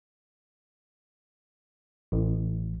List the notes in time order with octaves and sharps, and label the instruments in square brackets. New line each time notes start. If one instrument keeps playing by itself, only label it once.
[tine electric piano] A1